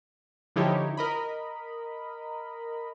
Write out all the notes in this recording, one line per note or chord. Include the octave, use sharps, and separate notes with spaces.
D3 F3 D#4 E4 G4 C#5
A#4 D#5 B5